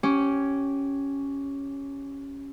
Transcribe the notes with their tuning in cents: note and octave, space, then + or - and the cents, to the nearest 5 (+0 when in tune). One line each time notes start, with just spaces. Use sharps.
C#4 +0 G4 -15